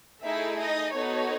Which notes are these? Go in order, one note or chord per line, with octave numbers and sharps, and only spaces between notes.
A3 D#4 E4 G#4 E5
D#4 D#5
B3 D#4 F#4 A4 C#5